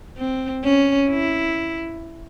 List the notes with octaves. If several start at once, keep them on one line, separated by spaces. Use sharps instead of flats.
C4
C#4
E4